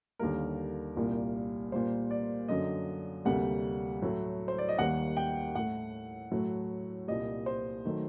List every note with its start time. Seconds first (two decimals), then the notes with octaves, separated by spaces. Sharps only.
0.19 D#2 D3 G3 A#3 A#4
0.97 C2 A#2 G3 A#3
1.72 A#2 G3 A#3 C5
2.11 D5
2.48 F#2 D3 F#3 D#5
3.25 D2 C3 G3 A#3 F#5
4.02 A2 F#3 A3
4.48 C5
4.58 D5
4.69 D#5
4.78 D#2 D#3 G3 A#3 F#5
5.17 G5
5.55 A2 A3 F#5
6.32 A2 F#3 A3
7.08 C2 A#2 G3 D#5
7.46 C5
7.85 D#3 F#3 A3